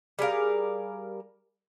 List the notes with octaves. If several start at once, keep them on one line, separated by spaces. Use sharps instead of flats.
G3 G#4 A#4 F5